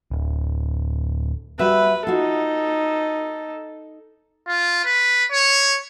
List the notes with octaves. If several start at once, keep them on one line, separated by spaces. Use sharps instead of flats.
D1
G3 F#4 B4 E5
D#4 F4 F#4 A4
F4
B4
C#5